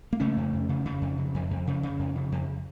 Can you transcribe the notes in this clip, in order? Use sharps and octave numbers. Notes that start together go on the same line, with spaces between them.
A#3
C#3 A3 C#4
F2
F2
C#3
C#3
F2
C#3
F2
F2
C#3
C#3
F2
C#3
F2